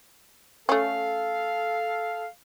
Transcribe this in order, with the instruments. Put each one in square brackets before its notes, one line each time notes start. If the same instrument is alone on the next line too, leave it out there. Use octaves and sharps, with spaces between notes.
[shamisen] A3 C#4 [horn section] A4 F5